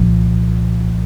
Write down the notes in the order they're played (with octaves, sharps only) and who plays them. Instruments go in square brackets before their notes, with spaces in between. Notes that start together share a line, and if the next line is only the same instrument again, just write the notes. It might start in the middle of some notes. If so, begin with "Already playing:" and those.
Already playing: [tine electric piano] C2 A#2 F3